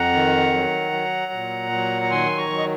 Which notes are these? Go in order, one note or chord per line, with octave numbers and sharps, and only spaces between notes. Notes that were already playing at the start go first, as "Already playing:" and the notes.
Already playing: F2 F#5 A#5
D#3
F#3
F#3
A#2
F#3
A#5
D#3 G#5 C6
A#5 C#6
F#3
D#5